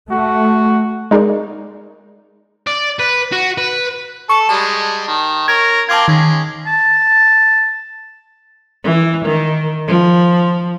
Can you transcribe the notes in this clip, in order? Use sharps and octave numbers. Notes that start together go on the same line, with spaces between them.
A3 F#4
G#3 D#4 G#4 A#4 D5
D5
B4
F#4
B4
A4 C#6
G3 G#3 A5
D#3
A#4 C#5 G#6
C4 F4 A#4 A5 D6 G#6
D#3 G#3 C#4
A5
E3
D#3
F3